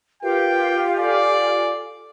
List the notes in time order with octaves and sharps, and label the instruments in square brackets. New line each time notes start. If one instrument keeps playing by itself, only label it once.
[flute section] F4 G4 F5 [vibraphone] A#4 B4 [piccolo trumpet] G5
[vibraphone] A4 G#5 [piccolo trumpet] D5